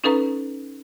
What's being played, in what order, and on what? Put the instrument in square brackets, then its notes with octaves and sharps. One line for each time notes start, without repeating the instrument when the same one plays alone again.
[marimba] C#4 D#4 A4 B4 A#5